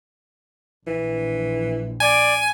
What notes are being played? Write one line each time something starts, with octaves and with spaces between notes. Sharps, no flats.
A#1 E3
D5 G#5